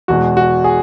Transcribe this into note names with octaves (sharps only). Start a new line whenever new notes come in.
E2 B2 G#3 F#4
F#4
G#4